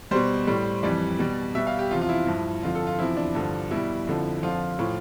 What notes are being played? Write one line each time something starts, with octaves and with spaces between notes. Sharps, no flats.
B2 G3 C5
A2 G3
F2 E3 G3 D5
B2 G3
B2 G3 E5
F5
G4
E2 C3 F3 F4
F4
E4
G2 F3
F2 D3 F3 F4
A4
F4
E2 C3 F3 E4
D4
G2 D3 F3
B2 G3 E4
F2 D3 F3
F2 D3 F3 F4
A2 F3